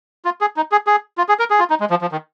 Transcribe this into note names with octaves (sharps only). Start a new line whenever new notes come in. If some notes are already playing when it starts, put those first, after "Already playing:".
F4
G#4
D#4
G#4
G#4
F4
G#4
A#4
G#4
F4
D#4
G#3
F3
F3
D#3